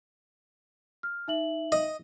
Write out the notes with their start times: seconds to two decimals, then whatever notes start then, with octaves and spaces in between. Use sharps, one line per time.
1.03 F6
1.28 D#4 E5 F#7
1.72 D#5